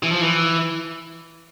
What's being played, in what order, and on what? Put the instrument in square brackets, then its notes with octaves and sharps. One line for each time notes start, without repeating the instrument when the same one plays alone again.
[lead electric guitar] E3
F3
E3